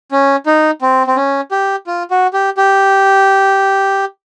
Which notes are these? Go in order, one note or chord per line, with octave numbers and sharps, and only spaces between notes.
C#4
D#4
C4
C4
C#4
G4
F4
F#4
G4
G4